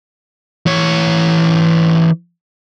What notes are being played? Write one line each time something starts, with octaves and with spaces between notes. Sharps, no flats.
E3 C#5